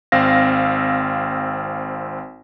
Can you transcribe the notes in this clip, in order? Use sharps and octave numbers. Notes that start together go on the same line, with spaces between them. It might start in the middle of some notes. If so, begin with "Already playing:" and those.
G#1 C4 F5 A#6